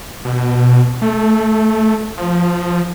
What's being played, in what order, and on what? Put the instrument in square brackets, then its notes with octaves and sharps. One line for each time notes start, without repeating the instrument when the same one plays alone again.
[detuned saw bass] B2
A3
F3